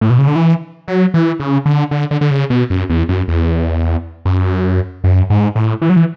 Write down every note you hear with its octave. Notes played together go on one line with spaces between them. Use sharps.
A2
B2
C#3
D3
E3
F#3
E3
C#3
D3
D3
D3
D3
C#3
B2
F#2
E2
F#2
E2
F#2
F#2
G#2
A2
E3
F#3
E3